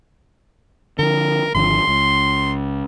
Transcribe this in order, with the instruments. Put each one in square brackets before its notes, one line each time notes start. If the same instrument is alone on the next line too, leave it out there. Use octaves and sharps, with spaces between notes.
[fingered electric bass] D3 F3 [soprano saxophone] A#4
[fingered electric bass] G#1 D3 F3 [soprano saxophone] C6
[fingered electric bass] C#2